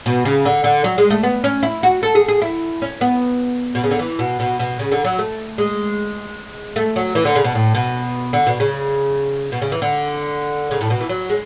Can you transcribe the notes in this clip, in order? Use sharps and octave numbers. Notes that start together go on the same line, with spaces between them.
B2
C#3
D3
D3
F#3
G#3
A3
B3
C#4
E4
F#4
A4
G#4
G#4
E4
C#4
B3
B2
C#3
D3
E3
B2
B2
B2
C#3
D3
F#3
A3
G#3
A3
F#3
E3
D3
C#3
B2
A2
B2
D3
B2
C#3
B2
C#3
E3
D3
C#3
A2
B2
E3
F#3
G#3